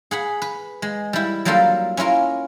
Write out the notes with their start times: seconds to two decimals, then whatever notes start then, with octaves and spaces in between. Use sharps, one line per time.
0.11 G#4 F#5 B5
0.42 B4
0.82 G#3
1.13 G3 E4
1.45 F#3 G3 A#3 D4 F4 A4
1.97 C#4 E4 F4 A#4